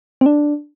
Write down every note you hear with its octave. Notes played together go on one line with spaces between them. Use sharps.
C4
D4